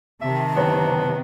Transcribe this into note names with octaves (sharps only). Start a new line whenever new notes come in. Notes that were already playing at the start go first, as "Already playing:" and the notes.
C3 D#3 E5 A5
F#1 B3 C#5 A#5